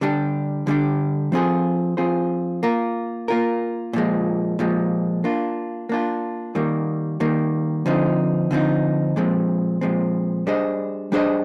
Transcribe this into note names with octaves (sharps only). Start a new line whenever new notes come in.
D3 G3 D4 G4
D3 G3 D4 G4
F3 C4 F4 G#4 C5
F3 C4 F4 G#4 C5
A#3 F4 A#4
A#3 F4 A#4
A#2 F3 G#3
A#2 F3 G#3
A#3 D4 F4
A#3 D4 F4
D#3 G3 A#3
D#3 G3 A#3
D3 F3 C4 D#4
D3 F3 C4 D#4
A#2 F3 G#3 C4
A#2 F3 G#3 C4
G3 D4 G#4 C5 D#5
G3 D4 G#4 C5 D#5